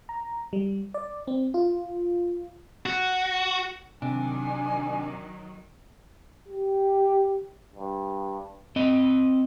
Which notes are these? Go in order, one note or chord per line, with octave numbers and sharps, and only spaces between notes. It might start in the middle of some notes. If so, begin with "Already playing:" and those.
A#5
G3
D5
C4
F4
F#4
C3 D#3 F#3 D4 G#5
G4
G2
C4 D#5